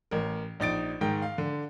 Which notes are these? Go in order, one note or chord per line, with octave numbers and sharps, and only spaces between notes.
A1 A#4
A#1 D#4 A6 D7
G#2 D#3 G5
F5
D3